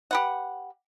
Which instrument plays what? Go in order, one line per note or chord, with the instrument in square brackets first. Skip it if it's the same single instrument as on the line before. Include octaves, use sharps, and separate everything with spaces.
[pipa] G4 B4 F#5